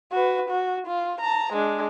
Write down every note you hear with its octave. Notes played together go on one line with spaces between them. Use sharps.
F#4 B4
F#4
F4
A5 A#5
G#3 D4